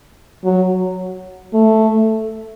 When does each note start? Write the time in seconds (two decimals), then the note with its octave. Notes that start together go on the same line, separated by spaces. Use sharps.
0.44 F#3
1.54 A3